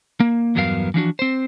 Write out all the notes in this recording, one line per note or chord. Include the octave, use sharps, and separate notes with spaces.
A#3
E2 G2 F#3 B3 A#4 F5
E3 F3 D4 F#4
C4 C5